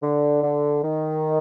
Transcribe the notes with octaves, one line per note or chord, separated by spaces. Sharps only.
D3
D3
D#3